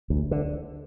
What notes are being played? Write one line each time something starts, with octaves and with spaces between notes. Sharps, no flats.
D2
D3